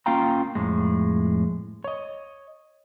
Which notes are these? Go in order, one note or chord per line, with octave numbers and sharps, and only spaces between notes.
A#3 C#4 F4 F5 G5 A#5
F2 A2 G#3
C#5 D#5